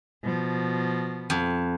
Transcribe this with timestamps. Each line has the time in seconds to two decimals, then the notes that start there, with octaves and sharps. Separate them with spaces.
0.24 B2 F3
1.30 F2